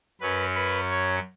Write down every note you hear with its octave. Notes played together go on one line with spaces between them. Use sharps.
F#2 F#3 C#4 B4
B4
C#5